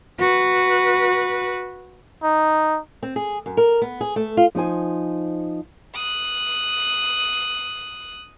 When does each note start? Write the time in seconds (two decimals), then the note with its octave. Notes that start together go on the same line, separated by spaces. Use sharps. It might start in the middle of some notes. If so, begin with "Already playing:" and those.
0.20 F#4 B4
2.23 D#4
3.03 C4
3.16 G#4
3.46 F#2
3.57 A#4
3.82 B3
4.01 G#4
4.16 A3
4.37 F4
4.55 F3 D#4 C5 G#5
5.95 D#6 F#6